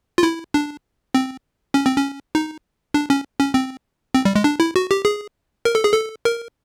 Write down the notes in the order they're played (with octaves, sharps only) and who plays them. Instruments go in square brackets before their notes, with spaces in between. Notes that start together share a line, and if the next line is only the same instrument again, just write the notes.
[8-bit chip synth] F4
E4
D4
C4
C#4
C4
C#4
D#4
D4
C#4
C#4
C4
C4
G3
G#3
D4
E4
F#4
G4
G#4
A#4
A4
G#4
A4
A#4